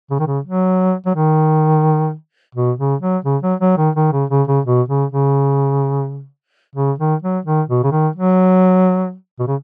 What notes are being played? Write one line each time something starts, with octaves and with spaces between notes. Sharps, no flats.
C#3
D#3
C#3
F#3
F#3
D#3
B2
C#3
F#3
C#3
F#3
F#3
D#3
D#3
C#3
C#3
C#3
B2
C#3
C#3
C#3
D#3
F#3
D#3
B2
C#3
D#3
F#3
B2
C#3